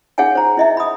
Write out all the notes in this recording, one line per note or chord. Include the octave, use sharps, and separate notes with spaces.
D#4 G#4 C#5 F5 F#5 G#5
C5 A#5
E4 D#5 E5
B5 D#6